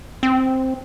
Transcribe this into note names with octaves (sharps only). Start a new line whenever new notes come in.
C4